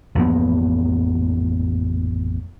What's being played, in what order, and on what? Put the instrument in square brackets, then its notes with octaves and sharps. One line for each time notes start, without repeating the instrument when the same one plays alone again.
[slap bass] A1 F2 A#3 B3